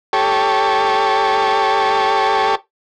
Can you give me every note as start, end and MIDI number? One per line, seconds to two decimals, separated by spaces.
0.13 2.55 67
0.13 2.55 69
0.13 2.55 73